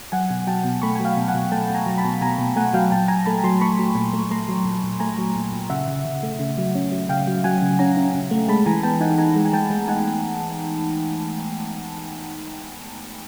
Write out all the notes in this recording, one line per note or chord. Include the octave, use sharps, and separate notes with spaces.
F#3 F#5 G#5
B2
F#3 G5 A5
B2
A3 B5 C#6
F#3 G#5
F5 G5
B2
F#5 G#5
B2
A3 G5 A5
B2 G#5 A#5
F#3
A5 B5
B2
B2 G#5 A#5
B2
A3 F#5 G#5
F#3 F5 G5
A#2 G5 A5
A#2 G#5 A#5
A3 A5 B5
F#3 A#5 C6
A3 B5 C#6
F#3
A#2
A3
A3 A#5 C6
F#3
A#2
A#2
A3 G#5 A#5
F#3
A#2
A#2
C#3 E5 F#5
C#3
C#3
A3
C#3
F#3
C#4
F#3
C#3 F5 G5
F#3
F#3 F#5 G#5
C#3
C#4 G#5 A#5
C#4
C#3
A3
G#3 A5 B5
E3 G#5 A#5
B3 G5 A5
D#4 F#5 G#5
D#4 G#5 A#5
G#3
G#5
G#3 G5 A5
G#3
D#4 F#5 G#5